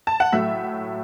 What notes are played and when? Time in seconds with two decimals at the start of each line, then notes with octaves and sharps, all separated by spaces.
0.07 A5
0.20 F#5
0.32 A2 F#3 A3 E5